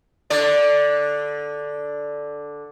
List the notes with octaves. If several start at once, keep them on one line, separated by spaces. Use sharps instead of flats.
D3 D5